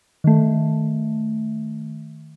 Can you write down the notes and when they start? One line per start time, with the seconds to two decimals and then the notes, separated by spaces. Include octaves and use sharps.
0.24 D#3 A3